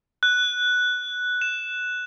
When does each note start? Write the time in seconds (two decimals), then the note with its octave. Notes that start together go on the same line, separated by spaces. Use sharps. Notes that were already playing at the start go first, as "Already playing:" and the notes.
0.23 F#6
1.41 E7